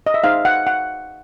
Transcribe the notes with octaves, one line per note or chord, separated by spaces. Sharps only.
D#5
E5
D#4 G#4 C5 F5
F#5
F#5